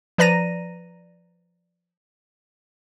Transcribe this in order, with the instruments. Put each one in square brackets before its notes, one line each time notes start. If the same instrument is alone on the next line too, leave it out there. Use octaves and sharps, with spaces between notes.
[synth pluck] F3 B4 D5 A#5 A#6 D#7